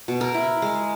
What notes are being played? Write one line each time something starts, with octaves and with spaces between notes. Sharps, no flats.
B2
A#4
E4
G#3